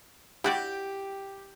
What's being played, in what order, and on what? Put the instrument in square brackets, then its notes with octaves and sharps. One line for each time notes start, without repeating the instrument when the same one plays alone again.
[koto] E4 F#4 D5 [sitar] G4 [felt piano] G5